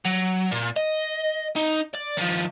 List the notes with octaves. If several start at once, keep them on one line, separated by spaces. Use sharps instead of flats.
F#3
A#2
D#5
D#4
D5
D#3 F3